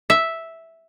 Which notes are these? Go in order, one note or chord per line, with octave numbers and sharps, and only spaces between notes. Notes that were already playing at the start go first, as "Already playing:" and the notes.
E5